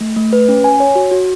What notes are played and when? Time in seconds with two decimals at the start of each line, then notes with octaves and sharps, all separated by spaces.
0.01 A3
0.16 A3
0.33 B4
0.49 C#4
0.64 G#5
0.80 C#5
0.95 F#4
1.11 F#4